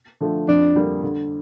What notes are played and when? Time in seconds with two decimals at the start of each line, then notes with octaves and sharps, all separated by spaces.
0.21 D3 F3 A3
0.48 F2 D4
0.75 D3 G3 A#3
1.03 D3